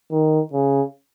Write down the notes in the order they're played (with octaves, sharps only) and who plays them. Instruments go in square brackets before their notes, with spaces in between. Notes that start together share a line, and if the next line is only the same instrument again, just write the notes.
[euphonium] D#3
C#3